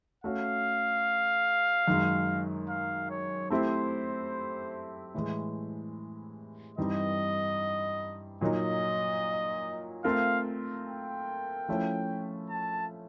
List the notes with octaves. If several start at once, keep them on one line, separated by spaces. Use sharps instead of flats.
A3 C#4 F#4 F5
F#2 D#3 G#3
F5
C#5
A3 C4 E4 G4 C5
A2 E3 G#3
G2 E3 G3 C4 D#4 D#5
A#2 F#3 A#3 D#4 D#5
A3 C4 F4 A#4 F5
G5
F3 A3 C#4 E4
A5